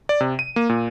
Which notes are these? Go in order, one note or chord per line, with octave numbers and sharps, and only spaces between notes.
D5
C3
D#7
A#3
A#2